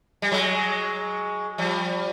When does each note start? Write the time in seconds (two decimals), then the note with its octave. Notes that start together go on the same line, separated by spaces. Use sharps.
0.22 G3
0.32 F#3 G#3
1.58 F3 G3